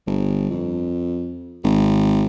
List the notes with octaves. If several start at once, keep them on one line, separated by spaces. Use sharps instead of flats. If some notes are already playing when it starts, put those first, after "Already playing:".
G1
F2
G#1